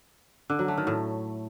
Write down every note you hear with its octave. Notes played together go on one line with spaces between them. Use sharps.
D3
F#3
A3
D#3
A2